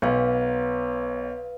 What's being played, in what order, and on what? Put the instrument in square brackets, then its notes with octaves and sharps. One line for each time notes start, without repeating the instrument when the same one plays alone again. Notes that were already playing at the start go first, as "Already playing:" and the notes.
[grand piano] B1 [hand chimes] B4 F5